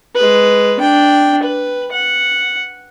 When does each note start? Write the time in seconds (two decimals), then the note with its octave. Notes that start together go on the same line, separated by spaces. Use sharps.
0.15 G#3 B4
0.80 D4 G5
1.43 B4
1.91 F#5